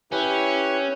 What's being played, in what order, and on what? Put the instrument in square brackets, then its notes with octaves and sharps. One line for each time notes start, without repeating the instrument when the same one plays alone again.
[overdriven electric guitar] C#4 [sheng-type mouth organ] E4 G4 B4